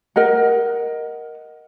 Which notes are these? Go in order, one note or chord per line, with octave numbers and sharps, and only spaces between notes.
A#4 D#5 F#5